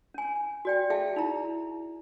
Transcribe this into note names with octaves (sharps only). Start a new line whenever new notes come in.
C#4 G#5
F#4 D5 G5
G#4 E5 F5 G5 A5
D#4 E4 A#5